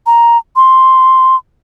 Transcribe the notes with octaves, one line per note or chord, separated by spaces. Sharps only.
A#5
C6